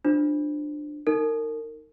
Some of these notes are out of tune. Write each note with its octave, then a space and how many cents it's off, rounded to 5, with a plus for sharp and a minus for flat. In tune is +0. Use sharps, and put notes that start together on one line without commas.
D4 +20 F4 +0 C5 +0
D#4 +0 A#4 -30